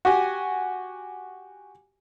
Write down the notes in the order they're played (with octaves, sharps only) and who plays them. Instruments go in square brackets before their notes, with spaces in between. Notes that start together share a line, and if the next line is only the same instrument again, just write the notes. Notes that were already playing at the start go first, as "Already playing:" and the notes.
[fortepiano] F#4 G4 G#5